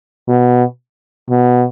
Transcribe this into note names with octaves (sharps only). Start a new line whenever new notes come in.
B2
B2